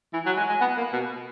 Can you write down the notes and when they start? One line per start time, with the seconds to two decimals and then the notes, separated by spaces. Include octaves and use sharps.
0.13 E3
0.26 F#3
0.37 G#3
0.49 G#3
0.61 B3
0.77 A#3
0.93 B2